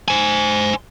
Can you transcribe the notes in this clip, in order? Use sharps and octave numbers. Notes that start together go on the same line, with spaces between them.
C5 G#5